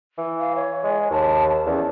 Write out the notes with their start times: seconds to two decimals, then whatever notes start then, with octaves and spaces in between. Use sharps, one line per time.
0.18 E3
0.40 F5
0.55 C#5
0.84 G#3
1.11 D#2 A5
1.66 E2 C#4